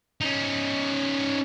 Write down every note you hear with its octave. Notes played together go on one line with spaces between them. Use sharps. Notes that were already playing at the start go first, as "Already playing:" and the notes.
C#4 D#4